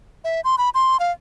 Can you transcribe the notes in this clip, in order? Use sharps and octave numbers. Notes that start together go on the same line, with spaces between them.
E5
C6
B5
C6
F5